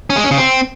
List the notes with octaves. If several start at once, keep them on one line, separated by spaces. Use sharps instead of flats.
C#4
G#3
C#4
C#3
C4